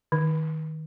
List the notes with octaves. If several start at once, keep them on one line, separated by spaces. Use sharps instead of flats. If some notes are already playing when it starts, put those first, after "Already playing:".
D#3